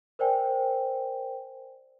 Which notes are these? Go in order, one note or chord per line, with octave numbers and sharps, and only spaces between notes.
A#4 C5 D5 G5 G#5